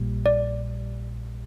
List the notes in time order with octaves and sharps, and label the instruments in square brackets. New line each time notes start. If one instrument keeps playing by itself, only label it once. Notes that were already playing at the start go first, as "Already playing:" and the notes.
Already playing: [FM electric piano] A#1 A#2 G3
[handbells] D5